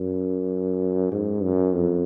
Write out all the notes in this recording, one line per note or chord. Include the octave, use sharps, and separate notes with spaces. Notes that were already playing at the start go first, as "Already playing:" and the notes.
Already playing: F#2
G#2
F#2
F2